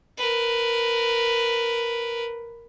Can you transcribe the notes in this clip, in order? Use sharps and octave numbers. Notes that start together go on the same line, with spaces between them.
A#4 B4